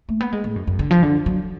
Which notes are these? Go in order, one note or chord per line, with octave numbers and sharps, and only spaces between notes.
A3
B3
G#3
A2
F#2
F#2
D3
F3
D3
F#3